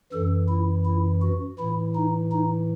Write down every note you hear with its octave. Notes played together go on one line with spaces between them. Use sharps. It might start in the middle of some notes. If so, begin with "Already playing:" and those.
F#2 E3 A4
E4
E4
F#4
A2 E3 E4
D#4
D#4